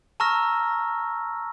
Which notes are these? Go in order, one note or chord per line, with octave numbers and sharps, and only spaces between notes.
A5 A#5 C#6 E6 F6 A#6